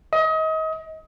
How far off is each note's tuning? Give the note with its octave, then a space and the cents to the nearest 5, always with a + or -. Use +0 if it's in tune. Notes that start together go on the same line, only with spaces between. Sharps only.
D#5 +30